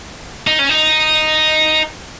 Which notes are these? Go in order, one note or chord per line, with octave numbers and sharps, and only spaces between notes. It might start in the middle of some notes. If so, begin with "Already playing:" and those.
D#4
C#4
D#4